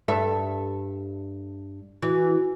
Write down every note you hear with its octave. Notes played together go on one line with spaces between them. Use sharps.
G2 A4 E5
E3 F#4